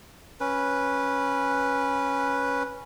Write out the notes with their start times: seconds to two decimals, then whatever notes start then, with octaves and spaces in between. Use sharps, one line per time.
0.40 C#4 B4